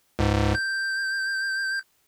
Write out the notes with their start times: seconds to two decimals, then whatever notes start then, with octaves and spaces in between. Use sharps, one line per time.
0.19 C#2 G#2
0.55 G6